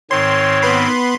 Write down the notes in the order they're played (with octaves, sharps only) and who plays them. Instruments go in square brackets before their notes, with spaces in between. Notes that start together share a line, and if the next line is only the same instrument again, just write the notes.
[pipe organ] G#2 D#3 C4 [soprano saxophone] C#5 [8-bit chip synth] C6
[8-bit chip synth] B3 B5 C6